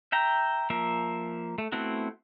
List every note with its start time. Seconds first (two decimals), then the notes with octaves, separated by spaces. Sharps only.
0.12 E5 G5 A#5
0.70 F3 A#3 E5
1.58 A3
1.72 A3 B3 C4 E4 F#4